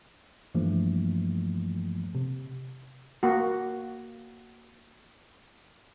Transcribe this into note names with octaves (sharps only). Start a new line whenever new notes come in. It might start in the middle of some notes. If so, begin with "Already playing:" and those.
G2 E3 F3 A3 A#3
C3
A#3 F#4